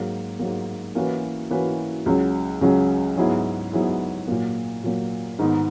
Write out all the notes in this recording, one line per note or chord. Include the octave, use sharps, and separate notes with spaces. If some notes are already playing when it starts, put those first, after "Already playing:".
Already playing: G#2 F#3 A#3
G#2 F#3 A#3
E3 A#3 C#4 F#4 B4
E3 A#3 C#4 F#4 B4
C#2 C#3 F#3
C#2 C#3 F#3
G#2 F#3 B3 E4 G#4
G#2 F#3 B3 E4 G#4
A#2 F#3 A#3
A#2 F#3 A#3
G#2 D#3 G#3 B3 D#4